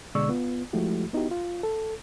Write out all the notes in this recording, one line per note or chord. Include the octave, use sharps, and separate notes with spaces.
B2 D3 G#3 D5 C#6 E6
B3 F4
F3 G#3 A3 E4 F#4 G4
B3 D#4 E4 F#4 G4
F4
A4